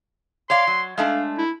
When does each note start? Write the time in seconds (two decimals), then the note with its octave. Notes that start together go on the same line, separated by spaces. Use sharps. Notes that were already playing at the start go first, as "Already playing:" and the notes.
0.50 C#5 D5 F5 C6
0.67 F#3
0.98 G#3 A3 D4 F5
1.38 E4